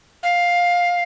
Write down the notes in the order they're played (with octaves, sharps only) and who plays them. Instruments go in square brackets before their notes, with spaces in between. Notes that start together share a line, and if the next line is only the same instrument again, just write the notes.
[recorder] F5